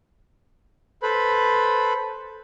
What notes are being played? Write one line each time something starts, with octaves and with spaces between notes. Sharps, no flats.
A4 B4 C5 B5